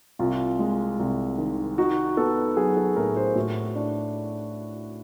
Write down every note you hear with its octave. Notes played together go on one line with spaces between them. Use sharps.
C2 F4
G#3
C2
D#3
D#4 F#4
B3 A4
F#3 G#4
A4
A2 A#4
C5
A2 F#4
D4